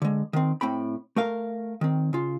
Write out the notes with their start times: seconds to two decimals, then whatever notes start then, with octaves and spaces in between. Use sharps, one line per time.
0.02 D3 G#3
0.33 D#3 C4
0.61 A2 C4 G5 B5
1.16 A3 A#4 F5
1.81 D#3 C4
2.13 C#3 F4